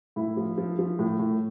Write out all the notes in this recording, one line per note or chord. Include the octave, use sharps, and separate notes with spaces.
A2 E4
F3
F3
F3
A2
A2